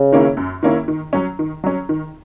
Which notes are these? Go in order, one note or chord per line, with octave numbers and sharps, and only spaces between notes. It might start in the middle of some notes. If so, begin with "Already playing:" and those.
Already playing: C#3
D#3 A#3 C#4 E4
F#2
D#3 A#3 C#4 E4
D#3
F#3 C#4
D#3
F#3 C#4
D#3